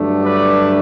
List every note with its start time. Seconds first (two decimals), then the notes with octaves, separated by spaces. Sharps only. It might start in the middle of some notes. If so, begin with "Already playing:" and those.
Already playing: G2 D3 F#3 A3 D4
0.25 B4 D5